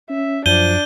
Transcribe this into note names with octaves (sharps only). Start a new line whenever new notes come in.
C#4 E5
F#2 F3 D4 G6 D#7 G7